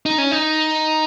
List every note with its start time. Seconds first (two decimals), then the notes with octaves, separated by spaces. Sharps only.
0.06 D#4
0.18 C#4
0.31 D#4